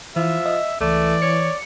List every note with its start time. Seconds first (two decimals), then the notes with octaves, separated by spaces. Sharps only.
0.16 E3 F3 E5
0.46 D#5
0.81 C#2 E3 A3 D5
1.22 C#5 C#7